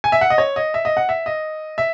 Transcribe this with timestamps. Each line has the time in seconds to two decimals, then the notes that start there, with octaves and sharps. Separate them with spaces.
0.04 G#5
0.12 E5
0.21 F#5
0.30 D#5
0.38 C#5
0.56 D#5
0.74 E5
0.85 D#5
0.97 F#5
1.09 E5
1.26 D#5
1.78 E5